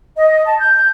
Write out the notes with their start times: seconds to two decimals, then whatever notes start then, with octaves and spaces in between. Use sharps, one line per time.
0.16 D#5
0.45 A5
0.58 G6